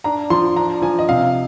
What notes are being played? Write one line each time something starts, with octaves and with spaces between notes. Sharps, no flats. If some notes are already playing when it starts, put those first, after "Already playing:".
D4 A#5
F3 C6
D4 A#5
F3 G#5
D#5
C3 F5